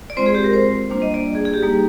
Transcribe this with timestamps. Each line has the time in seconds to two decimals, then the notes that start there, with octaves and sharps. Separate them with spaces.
0.10 D5
0.17 G#3 C4 F4 C5
0.26 G#4
0.35 G4
0.44 A#4
0.53 C5
0.89 G3 A#3 D4 F4 C5
1.02 D#5
1.14 D5
1.35 G#4
1.45 G#4
1.54 G4
1.63 G3 A#3 D#4